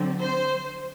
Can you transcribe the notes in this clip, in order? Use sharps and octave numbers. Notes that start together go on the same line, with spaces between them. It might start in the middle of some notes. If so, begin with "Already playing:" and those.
Already playing: D3 F#3 C4
C5